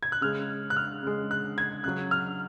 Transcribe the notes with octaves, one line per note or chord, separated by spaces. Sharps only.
G#6
F#6
C#3 G#3 F6
F#6
F6
C#3 G#3
F#6
G#6
C#3 F#3 F#6
F6